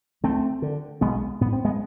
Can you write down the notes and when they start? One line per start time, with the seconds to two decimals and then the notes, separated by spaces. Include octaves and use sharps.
0.23 D2 A3 C4
0.62 D3
1.01 B1 G#3 B3
1.41 A2 B3
1.53 C4
1.65 G#3 B3